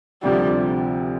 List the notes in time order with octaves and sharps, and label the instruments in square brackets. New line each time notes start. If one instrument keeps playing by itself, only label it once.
[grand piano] D2 C3 F3 [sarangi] G3